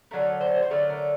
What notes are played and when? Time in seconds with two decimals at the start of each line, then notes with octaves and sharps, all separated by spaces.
0.11 D3 F#3 A3 A#4
0.41 C5
0.62 C5
0.70 D3 F#3 A3 A#4
0.90 A#4